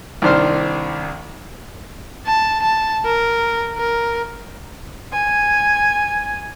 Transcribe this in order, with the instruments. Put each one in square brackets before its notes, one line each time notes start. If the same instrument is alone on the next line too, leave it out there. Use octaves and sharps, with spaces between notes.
[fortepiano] C2 D#3 D4 C5 F6
[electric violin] A5
A5
A#4
A#4
[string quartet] G#5